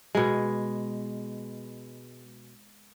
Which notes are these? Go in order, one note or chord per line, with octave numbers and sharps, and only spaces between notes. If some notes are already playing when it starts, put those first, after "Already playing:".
B2 G#3